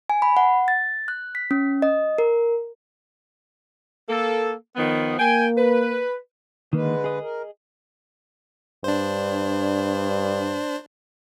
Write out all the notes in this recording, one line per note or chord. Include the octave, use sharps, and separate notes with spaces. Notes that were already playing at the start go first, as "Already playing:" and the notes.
G#5
B5
F#5
A6
F#6
B6
C#4
D#5
A#4
A#3 A4
D#3 F3 B3
A#3 G5 G#5
B4
D3 D#3 G#3 A#3 B4
G#4 D#5
A#4
G2 D4 C5